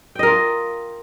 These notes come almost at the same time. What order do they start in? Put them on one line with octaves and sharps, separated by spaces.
G5 D#5 A#4 F4